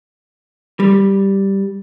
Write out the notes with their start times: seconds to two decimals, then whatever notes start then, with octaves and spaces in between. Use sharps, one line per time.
0.80 G3